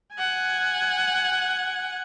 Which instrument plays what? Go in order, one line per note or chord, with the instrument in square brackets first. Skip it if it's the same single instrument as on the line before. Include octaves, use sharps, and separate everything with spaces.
[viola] F#5 G#5